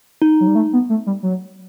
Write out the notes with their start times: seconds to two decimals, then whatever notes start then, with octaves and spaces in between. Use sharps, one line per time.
0.22 D#4
0.40 F#3
0.47 G3
0.55 A3
0.73 B3
0.89 A3
1.06 G3
1.23 F#3